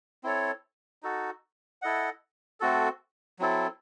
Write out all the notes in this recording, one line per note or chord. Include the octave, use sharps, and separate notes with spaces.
C4 E4 A4 C#5
D#4 F#4 A4
E4 A4 D#5 F#5
A3 C4 F#4 A4
F#3 C4 E4 A4